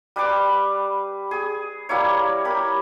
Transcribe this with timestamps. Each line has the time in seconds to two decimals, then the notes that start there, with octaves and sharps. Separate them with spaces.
0.16 G3 B4 C6 D6
1.31 G#4
1.89 G3 A#3 E4 C#5
2.45 G4 A#4 B5